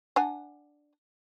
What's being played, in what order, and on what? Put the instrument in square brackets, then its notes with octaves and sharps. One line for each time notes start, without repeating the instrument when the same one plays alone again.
[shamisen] D4 F#5 G#5